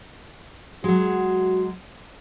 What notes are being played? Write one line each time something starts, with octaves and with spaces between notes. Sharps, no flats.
F#3 G#3 F#4